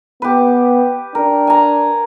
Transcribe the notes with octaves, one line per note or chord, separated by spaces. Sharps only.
B3 G4 B4
D4 A#4
G#5 A#5